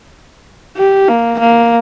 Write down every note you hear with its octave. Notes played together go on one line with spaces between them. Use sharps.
G4
A#3
A#3